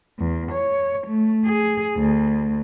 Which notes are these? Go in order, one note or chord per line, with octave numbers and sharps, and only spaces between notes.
E2
C#5
A3
G#4
D2